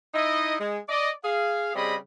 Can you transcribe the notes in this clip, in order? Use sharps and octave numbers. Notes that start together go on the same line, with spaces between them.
D#4 E4 D#5
G#3
D5 D#5
G#4 F5
C#3 G3 C4 G#4 D#5 B5